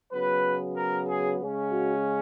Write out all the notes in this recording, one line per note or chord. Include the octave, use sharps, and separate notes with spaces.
C#3 F#3 B3 B4
A#4
G#4
C#3 G#3 C#4
F#4